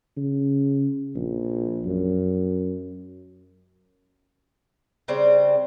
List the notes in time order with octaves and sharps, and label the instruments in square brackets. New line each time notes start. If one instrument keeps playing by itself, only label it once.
[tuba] C#3
A#1
F#2
[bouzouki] C#3 G3 C4